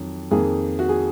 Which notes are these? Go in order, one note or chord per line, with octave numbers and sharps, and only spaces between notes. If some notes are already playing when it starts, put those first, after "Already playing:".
Already playing: F2 D#3 F#3
F2 D#3 A#3 G#4
F#4
G#4